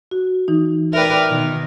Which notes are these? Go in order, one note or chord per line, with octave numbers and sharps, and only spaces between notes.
F#4
E3 D#4
A#4 B4 D5 E5 G5
B2 D#3